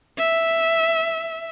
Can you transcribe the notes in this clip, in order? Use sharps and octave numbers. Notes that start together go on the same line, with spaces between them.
E5